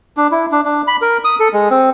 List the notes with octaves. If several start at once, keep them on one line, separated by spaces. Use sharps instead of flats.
D4
E4
D4
D4
B5
A#4
D#6
A4
G#3
C4